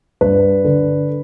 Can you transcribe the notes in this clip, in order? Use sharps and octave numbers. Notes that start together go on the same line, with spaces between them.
G2 B4
D3